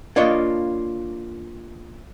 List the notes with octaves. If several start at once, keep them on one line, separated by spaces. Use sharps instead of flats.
A#3 D4 F4 C#5 D#5